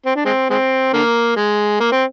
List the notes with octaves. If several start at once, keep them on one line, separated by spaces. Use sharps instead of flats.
C4
D4
G#3 C4
G#3 C4
D3 A#3
G#3
A#3
C4